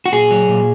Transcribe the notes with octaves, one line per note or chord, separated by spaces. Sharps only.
F#4
A#2 G#4
F#3
A#2